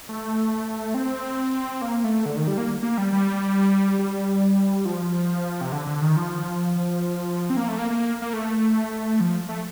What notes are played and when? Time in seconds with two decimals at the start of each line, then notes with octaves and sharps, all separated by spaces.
0.09 A3
0.94 C4
1.82 A#3
2.04 A3
2.26 D3
2.37 D#3
2.48 G3
2.58 A#3
2.83 A#3
2.98 G3
3.12 G3
3.99 G3
4.85 F3
5.61 C3
5.72 D3
5.87 D3
6.01 D#3
6.17 F3
7.50 C4
7.57 A#3
7.68 A3
7.78 A#3
7.90 A#3
8.22 A#3
8.33 A3
9.20 F3
9.49 A3